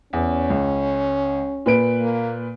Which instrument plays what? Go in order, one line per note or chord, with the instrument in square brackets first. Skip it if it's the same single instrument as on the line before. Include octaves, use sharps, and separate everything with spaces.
[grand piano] E2 [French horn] C#4
[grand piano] C#2
A#2 B4 D7
[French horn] A#3